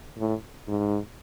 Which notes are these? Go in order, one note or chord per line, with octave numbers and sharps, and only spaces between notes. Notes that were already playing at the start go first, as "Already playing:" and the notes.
A2
G#2